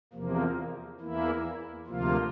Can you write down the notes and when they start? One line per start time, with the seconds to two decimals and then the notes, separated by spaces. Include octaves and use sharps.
0.13 E2 C3 F3 A#3
1.00 E2 E3 A#3 E4
1.87 D2 C3 F3 A#3 F4